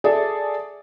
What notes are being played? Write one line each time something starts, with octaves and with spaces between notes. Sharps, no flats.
G#4 A4 D5 E5